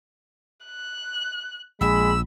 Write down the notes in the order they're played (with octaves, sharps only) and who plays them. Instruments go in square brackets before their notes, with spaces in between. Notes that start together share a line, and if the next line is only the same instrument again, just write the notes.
[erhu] F#6
[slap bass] A#1 [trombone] G#3 [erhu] B5 [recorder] E6